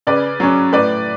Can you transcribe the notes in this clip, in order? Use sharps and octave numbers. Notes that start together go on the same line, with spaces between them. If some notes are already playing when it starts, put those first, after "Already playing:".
C#3 B4 D5
F#3 C#4
A2 B4 D5